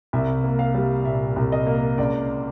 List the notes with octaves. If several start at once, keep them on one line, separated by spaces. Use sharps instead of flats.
C2 E5
A#3
F5
G3
A#2 E5
C2
D#5
A#3
C#2 D5